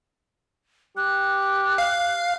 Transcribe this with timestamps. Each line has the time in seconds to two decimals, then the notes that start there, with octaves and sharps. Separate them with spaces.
0.97 G4 F#6
1.78 F5